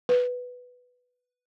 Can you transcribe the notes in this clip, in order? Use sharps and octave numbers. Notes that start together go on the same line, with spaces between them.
B4